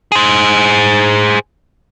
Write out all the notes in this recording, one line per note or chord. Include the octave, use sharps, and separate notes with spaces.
G#4 C5